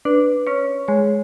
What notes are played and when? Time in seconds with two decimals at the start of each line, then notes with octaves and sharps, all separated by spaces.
0.05 D4 B4
0.47 C#4 C#5
0.88 G#3 C#5